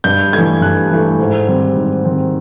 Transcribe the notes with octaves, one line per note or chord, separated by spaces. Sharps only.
G2 G6
E3 A3 G#6
G2 F#6
E3 A3
G#2
D#3 G3 C4
G#2
D#3 G3 C4